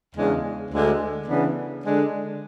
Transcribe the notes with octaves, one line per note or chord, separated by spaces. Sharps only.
E2 C#3 G#3 D4
D2 D3 G#3
C#3 E3 B3 D4
D3 G#3 D4